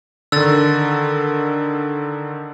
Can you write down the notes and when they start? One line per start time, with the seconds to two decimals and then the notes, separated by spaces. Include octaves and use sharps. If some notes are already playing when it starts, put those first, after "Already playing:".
0.32 D3 D#3 E6 A6